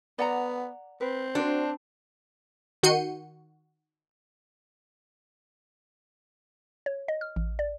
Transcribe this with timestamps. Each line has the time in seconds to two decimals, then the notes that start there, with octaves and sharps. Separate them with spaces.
0.19 B3 D5 F#5 A#5
1.01 C4 B4
1.35 D4 F#4 C5
2.83 D#3 F#4 G6 C7 C#7 D#7
6.86 C#5
7.08 D#5
7.21 F6
7.36 A1
7.59 D5